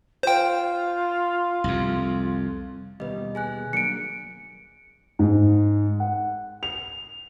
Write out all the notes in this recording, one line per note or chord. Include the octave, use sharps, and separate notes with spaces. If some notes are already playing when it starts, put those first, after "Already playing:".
F4 C5 G5
C2 F2
D#2 B2 G3 B4 D#5
G#4 G#5 F#6
F#3 A#3 D4 C#7 D7
G#2
F#5
F7